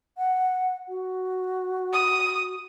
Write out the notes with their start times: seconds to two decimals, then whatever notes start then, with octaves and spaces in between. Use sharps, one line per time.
0.18 F#5
0.89 F#4
1.93 D#6